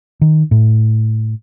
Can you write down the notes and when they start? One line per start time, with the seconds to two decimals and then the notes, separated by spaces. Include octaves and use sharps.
0.21 D#3
0.51 A2